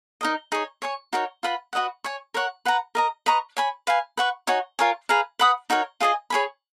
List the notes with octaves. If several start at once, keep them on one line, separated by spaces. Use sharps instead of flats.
D#4 A#4 D#5
D#4 G#4 C#5
C#5 G#5 C#6
D#4 F#4 A#4 C#5
F4 B4 F#5 B5
F#4 B4 D#5 F#5
C#5 G#5 C#6
A#4 C#5 F#5 C#6
B4 F#5 A#5
A#4 D#5 A#5
B4 D#5 A#5 C#6
C#5 G#5 B5
B4 F5 G#5
B4 F#5 C#6
D#4 F#4 C#5 G#5
F4 A#4 C#5 G#5
G#4 B4 F5 A#5
B4 F#5 B5 D#6
D#4 F#4 A#4 C#5
F4 G#4 D#5 G#5
G#4 C#5 G#5 B5